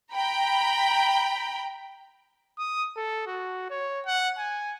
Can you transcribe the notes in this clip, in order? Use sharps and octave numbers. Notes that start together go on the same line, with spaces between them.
G5 A#5 B5
D#6
A4
F#4
C#5
F#5
G#5